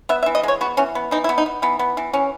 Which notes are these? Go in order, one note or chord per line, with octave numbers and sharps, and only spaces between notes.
B3 E5
E5
E3
D#5
G#3 C#5
B3 F#4
E3 C#4
B3
E3 D#4
E4
B3
D#4
B3
E3 B3
B3
E3
E3 C#4